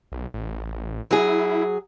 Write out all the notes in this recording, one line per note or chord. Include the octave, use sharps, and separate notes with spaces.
B1
A1
F#3 E4 G#4